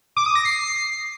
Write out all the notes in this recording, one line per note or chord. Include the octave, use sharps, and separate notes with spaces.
D6
D#6
A#6
C7